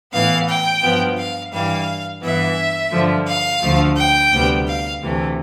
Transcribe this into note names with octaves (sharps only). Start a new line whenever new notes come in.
A2 E3 B3 F5
G5
G2 F3 B3
F5
G2 E3 G3 F5
G2 E3 B3 E5
G2 D3 F3
F5
D2 D3 F3 A3
G5
D2 C3 G3 B3
F5
D2 C3 E3 A3